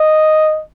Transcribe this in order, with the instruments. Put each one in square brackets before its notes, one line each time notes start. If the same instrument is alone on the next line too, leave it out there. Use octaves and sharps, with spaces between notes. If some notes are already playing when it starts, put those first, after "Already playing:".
Already playing: [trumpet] D#5